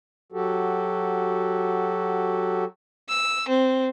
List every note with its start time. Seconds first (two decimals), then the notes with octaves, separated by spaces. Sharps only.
0.32 F#3 F#4 G4 A4
3.09 E6
3.49 C4